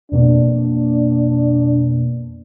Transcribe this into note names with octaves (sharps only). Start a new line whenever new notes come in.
F2 B2 A#3 D4